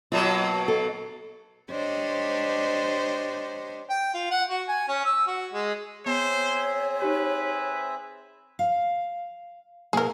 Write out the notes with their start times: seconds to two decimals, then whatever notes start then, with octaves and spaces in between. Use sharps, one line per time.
0.12 B2 F#3 A#3 F4
0.68 A4
1.71 D4 G4 C5 C#5 D#5
3.90 G5
4.14 F4
4.31 F#5
4.50 F#4
4.69 G#5
4.88 C#4
5.05 E6
5.27 F#4
5.53 G#3
6.06 B3 C4 G#4 C5 C#5 E5
7.00 D#4 G4 B4 G#5
8.59 F5
9.93 B2 A#3 E4 G#4 A#4